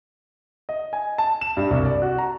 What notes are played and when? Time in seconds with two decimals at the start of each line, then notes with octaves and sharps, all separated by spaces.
0.69 D#5
0.93 G#5
1.18 A5
1.41 E7
1.57 G2
1.70 C2
1.85 D5
2.02 F#4
2.18 A#5